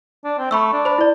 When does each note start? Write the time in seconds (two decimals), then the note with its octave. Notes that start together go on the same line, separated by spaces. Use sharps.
0.24 D4
0.38 C4
0.51 A3 B5 C#6 E6
0.73 D4
0.85 C5 B5
0.98 E4 D5